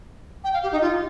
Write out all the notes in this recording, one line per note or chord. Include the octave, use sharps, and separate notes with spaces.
G5
F5
G4
D#4
F4